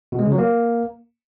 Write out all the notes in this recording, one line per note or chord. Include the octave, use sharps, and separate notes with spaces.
B2
G#3
C#3
F#3
A#3